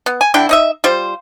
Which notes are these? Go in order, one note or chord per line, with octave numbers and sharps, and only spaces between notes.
B3
G#5
D3 D4 E4 G5
D#4 D#5 E5
G3 F4 C5